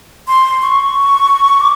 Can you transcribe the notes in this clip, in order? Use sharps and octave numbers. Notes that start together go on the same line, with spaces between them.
C6
C#6
D6